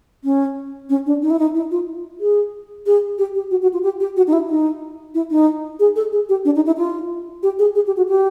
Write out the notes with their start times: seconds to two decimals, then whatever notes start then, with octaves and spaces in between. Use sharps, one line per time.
0.24 C#4
0.90 C#4
1.06 D4
1.22 D#4
1.30 E4
1.39 D#4
1.55 E4
1.71 F4
2.20 G#4
2.86 G#4
3.18 G4
3.35 G4
3.51 F#4
3.62 F#4
3.73 F4
3.83 G4
4.00 G4
4.17 F#4
4.27 D#4
4.33 E4
4.49 D#4
5.14 E4
5.31 D#4
5.80 G#4
5.96 A4
6.12 G#4
6.29 G4
6.45 D4
6.56 D#4
6.66 E4
6.78 F4
7.43 G4
7.59 G#4
7.75 G#4
7.87 G4
7.97 F#4
8.09 G4